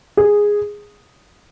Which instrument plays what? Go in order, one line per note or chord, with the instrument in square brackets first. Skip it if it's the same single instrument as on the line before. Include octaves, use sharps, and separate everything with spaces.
[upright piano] G#4